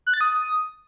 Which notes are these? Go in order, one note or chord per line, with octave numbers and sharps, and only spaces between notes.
F#6
A6
D#6